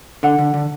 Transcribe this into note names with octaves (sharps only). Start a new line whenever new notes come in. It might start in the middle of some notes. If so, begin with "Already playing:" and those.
D3 F#5
D3
D3